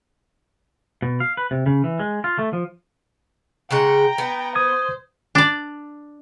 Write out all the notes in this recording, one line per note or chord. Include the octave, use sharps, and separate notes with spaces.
B2
F5
B4
C3
C#3
E3
G#3
F4
A3
F3
C#3 G#3 F#5 G5 A#5
B3
C5 D#6 G#6
D4 D5